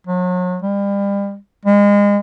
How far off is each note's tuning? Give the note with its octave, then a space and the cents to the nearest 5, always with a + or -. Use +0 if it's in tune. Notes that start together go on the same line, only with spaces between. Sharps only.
F#3 -35
G3 +35
G#3 -30